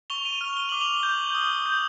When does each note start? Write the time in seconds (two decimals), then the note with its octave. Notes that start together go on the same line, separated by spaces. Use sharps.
0.10 C#6 F7 G7
0.25 D#7 F7
0.41 F6
0.57 G7
0.69 D6 F#7
0.81 F7 G7
1.03 G6
1.35 D#6
1.66 G6